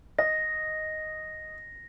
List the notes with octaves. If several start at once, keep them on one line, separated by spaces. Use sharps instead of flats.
D#5 A#6